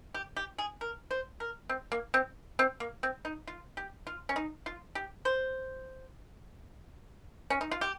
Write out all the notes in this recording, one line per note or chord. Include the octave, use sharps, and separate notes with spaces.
G4
G4
G#4
A#4
C5
A#4
C4
A#3
C4
C4
A#3
C4
D#4
F4
G4
F4
C#4
D#4
F4
G4
C5
C#4
D#4
F4
G4